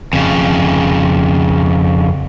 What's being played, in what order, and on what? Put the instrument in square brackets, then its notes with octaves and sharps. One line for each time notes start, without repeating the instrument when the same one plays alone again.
[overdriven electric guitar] F2 C#3